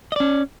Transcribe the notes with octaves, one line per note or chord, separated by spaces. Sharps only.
C#4 D5 D#5